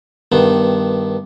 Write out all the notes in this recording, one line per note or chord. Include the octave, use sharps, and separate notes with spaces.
G2 D#3 B3